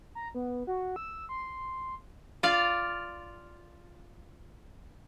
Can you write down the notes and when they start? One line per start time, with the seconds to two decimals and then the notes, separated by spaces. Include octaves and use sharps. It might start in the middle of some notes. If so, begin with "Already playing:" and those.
0.15 A#5
0.34 B3
0.67 F#4
0.96 E6
1.29 C6
2.43 F4 D5 F5